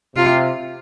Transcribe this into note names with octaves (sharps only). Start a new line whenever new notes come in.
C3 F4